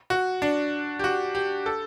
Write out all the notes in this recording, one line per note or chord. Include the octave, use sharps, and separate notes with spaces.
F#4
D4
G4
F#4
G4
A4